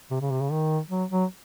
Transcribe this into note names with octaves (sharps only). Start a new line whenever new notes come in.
C3
C#3
C3
C#3
D#3
F#3
F#3